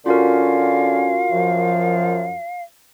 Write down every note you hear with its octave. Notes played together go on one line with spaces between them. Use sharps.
D3 C#4 F4 F#4 A#4 F5
F#2 F3